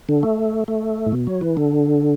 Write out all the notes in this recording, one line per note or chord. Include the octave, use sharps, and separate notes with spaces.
D3
A3
A3
A2
B2
F#3
E3
D3